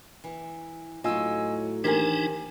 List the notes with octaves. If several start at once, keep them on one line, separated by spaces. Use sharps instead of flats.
E3
A2 F#3 D#4 F4 D#5 G#5 E6
D#2 E3 D4 D#4 G4 A#4 C5 G#5